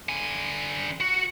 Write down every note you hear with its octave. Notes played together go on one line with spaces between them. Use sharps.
D3 G#5
F#4